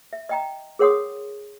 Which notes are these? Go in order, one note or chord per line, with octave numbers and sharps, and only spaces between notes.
E5
D#5 G5 A#5
G#4 A#4 C#5 F#5 C6 D#6